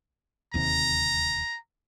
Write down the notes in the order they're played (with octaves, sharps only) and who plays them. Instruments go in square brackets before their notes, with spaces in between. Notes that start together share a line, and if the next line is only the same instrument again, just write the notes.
[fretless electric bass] D1 D#2 C3 [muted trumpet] A#5